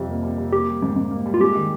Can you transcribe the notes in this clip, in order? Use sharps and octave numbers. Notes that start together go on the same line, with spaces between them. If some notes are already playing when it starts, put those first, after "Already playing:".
Already playing: F2 C3 G3
A#3
G3
C3
A#3 G4
G3
G#2
G#2
A#3
G3
F4
G#3 G4
D#3